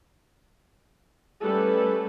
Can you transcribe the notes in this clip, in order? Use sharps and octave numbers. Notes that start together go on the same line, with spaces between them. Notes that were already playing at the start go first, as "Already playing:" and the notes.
G3 A3 C#4 A4 B4